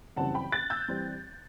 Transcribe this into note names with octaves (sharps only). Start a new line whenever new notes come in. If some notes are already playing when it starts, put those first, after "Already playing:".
F#1 F#2 E3 G3 C4 F#5 A5
G5 B5
F#6 A6
E6 G6
E3 G3 C4